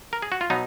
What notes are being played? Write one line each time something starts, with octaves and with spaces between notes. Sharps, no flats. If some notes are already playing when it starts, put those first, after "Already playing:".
A#4
G#4
F#4
F4
B2 F#3 B3 D#4